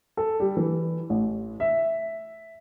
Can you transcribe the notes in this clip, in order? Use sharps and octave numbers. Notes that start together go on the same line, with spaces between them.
A4
G3
E3
A1
E5